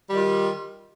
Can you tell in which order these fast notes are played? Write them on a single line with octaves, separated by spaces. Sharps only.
G3 D#3 F4